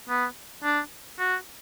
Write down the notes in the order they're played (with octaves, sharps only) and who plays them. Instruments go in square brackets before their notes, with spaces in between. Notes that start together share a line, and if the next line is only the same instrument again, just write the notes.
[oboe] B3
D4
F#4